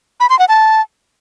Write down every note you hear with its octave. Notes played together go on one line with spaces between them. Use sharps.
B5
C6
F#5
A5